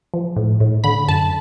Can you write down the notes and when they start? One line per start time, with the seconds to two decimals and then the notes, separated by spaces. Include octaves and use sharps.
0.14 F3
0.36 A2
0.60 A2
0.84 D3 B5
1.08 F#2 A5